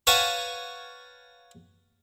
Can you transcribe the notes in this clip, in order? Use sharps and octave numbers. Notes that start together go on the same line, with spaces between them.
B4 C#5 F5 F#5 G#5 A5